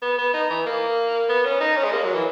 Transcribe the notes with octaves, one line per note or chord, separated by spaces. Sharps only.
B3
B3
D#4
E3
A#3
B3
C#4
D#4
C#4
G#3
A#3
F#3
E3